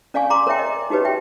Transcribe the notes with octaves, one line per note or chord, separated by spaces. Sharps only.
C#4 D5 F5 G#5 C#6
A#5 C6 D6
A#4 C#5 E5 G5
D#5
D#4 F#4 G4 B4 C#5
E5 G5